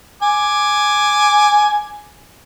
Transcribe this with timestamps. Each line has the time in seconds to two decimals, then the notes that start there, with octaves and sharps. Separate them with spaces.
0.22 G#5 D6